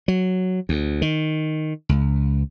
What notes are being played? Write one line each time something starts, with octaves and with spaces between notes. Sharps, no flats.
F#3
D2
D#3
C#2